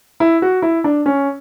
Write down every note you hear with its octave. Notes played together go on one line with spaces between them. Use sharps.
E4
F#4
E4
D4
C#4